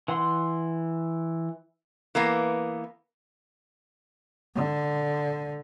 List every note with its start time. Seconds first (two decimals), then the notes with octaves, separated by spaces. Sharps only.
0.08 E3 F#5 C6
2.15 E3 A#3 B3
4.55 D3